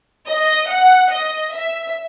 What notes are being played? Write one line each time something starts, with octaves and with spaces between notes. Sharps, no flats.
D#5
F#5
D#5
E5